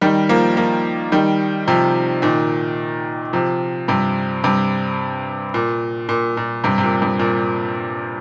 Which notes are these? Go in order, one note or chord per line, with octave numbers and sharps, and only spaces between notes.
D#3 G3
F3 A#3
F3 A#3
D#3 G3
C3 F3
A#2 D#3
C3 F3
G2 C3
G2 C3
A#2
A#2
A#2
G2 C3
C3
A#2
G2
A#2